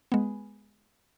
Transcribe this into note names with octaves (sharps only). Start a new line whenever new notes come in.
G#3 B3